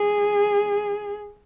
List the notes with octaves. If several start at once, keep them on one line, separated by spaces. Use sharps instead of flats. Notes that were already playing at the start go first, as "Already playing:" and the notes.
Already playing: G#4